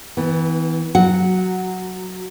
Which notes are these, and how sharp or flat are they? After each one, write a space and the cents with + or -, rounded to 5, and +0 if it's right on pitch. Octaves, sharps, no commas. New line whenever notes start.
E3 -25 B3 +15
F#3 +0 F#5 +0